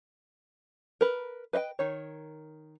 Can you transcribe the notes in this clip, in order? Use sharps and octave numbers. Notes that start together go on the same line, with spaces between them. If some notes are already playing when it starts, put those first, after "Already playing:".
A#4 B4
B4 D#5 E5 G5
D#3 C#5